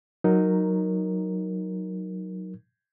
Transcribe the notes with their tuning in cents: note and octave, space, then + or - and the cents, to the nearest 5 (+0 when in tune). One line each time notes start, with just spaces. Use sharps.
F#3 +0 D#4 +0 A#4 +0